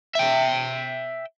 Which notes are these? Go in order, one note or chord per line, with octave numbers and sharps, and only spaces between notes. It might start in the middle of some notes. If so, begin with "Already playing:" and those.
E5 G5